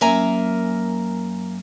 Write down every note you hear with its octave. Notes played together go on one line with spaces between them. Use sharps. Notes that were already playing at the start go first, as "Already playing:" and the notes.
F#2 A#3 A#4 E5 G#5 A#5